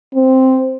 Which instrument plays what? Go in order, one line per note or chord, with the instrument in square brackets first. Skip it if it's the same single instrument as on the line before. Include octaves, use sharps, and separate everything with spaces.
[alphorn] C4